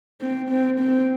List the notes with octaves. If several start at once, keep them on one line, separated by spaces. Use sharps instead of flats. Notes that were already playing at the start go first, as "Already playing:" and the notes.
C4
C4
C4